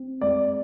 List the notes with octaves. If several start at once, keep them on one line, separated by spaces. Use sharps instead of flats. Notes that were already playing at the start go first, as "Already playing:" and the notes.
Already playing: C4
G#3 D5